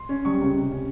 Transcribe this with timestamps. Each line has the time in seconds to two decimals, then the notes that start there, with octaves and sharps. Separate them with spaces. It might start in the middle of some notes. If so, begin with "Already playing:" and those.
Already playing: C6
0.09 C#4
0.25 G3 C#6
0.41 C#2
0.56 C3
0.71 C#4